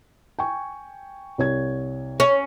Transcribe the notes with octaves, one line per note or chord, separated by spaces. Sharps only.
G5 G#5 C#6
C2 C#5 G#6
C#4